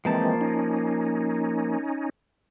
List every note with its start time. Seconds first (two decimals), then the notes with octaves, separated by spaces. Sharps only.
0.05 E3 F3 G#3 A#3 C4 A5
0.41 C#4 D#4